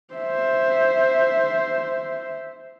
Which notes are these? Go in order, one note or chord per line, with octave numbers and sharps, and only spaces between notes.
C5 E5